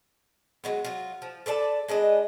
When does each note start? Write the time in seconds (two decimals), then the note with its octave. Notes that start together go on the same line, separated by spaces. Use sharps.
0.64 F#3 G#3 B3
0.85 F#3 F4
1.22 F3
1.46 A4 B4 D5 A5
1.88 G#3 D4 B4 D#5